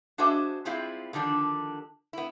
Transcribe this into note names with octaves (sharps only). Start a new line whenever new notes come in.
D4 F#4 G#4 C5 D#5 E5
G3 G#3 C4 E4 F4
D3 D#3 F3 G3 D4
B3 E4